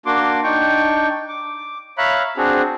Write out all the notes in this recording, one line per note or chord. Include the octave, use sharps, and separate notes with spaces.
A#3 D4 F#4 C6 D6
D4 D#4 G5 C#6
D6
C#5 E5 F5 A#5 B5 F#6
C4 D4 F#4 G#4